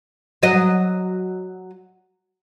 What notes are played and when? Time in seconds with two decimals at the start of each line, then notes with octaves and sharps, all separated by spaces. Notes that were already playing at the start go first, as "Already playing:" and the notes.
0.43 F#3 D#5